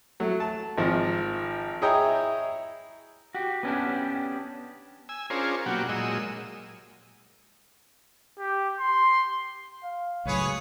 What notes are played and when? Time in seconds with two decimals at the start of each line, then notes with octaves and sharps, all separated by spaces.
0.20 F#3 A3
0.40 A5
0.77 G#1 F3
1.82 E4 G#4 C#5 D#5 G5 A#5
3.34 F#4 G4
3.63 B3 C#4 D4 G4
5.09 G#5 E6
5.30 C#4 D4 F4 G#4 A#4 C5
5.66 B2 F#3 A#3 D4 F#4 G4
5.89 A#2 F#3 G#3 D#5 E6
8.39 G4
8.80 C6
9.84 F5
10.25 C#2 A2 F#3 G#4 B4 C#5